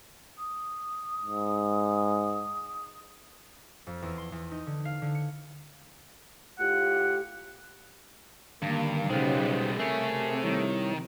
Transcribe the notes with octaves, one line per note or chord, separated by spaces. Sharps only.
D#6
G#2
F2
E2
C6
E2
D#4
D3
F5
D3
C#7
A2 F4 G4 F#5
G2 D3 D#3 G3 A#3
B1 C#3 G3 G#3 B3 D#4 C5 G5
C3 A3 G#4 A#4 C#5 E5 G#5
D#3 G3 E4 C#5